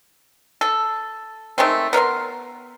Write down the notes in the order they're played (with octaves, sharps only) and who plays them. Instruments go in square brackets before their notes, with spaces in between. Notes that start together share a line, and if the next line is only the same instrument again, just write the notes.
[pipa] A4
D#3 G#3 A3 C4
B3 A#4 E5 C6